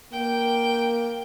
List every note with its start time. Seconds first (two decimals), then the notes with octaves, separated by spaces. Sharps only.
0.13 A#3 G5